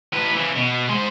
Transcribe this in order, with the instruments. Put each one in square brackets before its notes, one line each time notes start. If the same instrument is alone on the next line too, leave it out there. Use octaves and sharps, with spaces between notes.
[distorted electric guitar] A2 B4
C#3 E3
B2
G#3 C5